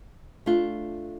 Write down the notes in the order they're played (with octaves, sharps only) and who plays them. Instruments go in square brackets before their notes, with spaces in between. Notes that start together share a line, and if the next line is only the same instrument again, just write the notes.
[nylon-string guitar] A3 D4 F4